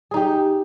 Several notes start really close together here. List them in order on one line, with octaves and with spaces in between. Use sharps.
G#4 D#4 G4